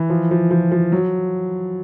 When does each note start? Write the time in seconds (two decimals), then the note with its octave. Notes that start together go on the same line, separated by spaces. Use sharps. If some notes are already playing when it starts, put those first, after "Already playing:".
Already playing: E3
0.10 F3
0.31 F3
0.51 F3
0.72 F3
0.92 F#3